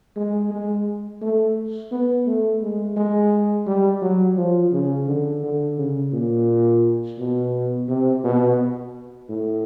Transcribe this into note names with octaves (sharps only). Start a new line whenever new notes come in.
G#3
G#3
A3
B3
A3
G#3
G#3
G3
F#3
F3
C#3
D3
D3
C#3
A#2
B2
C3
B2
A2